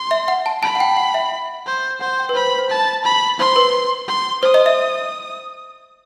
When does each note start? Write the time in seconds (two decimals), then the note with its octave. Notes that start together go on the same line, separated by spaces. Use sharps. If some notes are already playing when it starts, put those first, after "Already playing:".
Already playing: C6
0.11 E5
0.28 F#5
0.46 A5
0.63 A5 B5
0.75 F#5
0.80 G5
0.97 F#5
1.14 E5
1.66 C5
2.00 C5 F#5
2.19 G5
2.29 B4
2.35 C5 B5
2.47 B4
2.59 C5
2.70 A5
3.04 B5
3.39 C5 C6
3.56 B4
4.08 C6
4.43 C5 D#6
4.54 D#5
4.66 E5